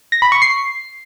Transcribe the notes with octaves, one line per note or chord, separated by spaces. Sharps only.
A#6
B5
C#6
C7